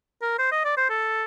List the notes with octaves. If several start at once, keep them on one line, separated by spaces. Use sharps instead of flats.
A#4
C5
D#5
D5
C5
A4